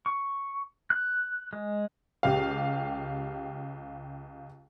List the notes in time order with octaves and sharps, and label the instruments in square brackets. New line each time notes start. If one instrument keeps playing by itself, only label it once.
[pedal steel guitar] C#6
F#6
G#3
[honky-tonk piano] C#2 G4 F5